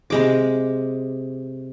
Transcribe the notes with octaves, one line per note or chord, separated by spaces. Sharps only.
C3 G#3 D6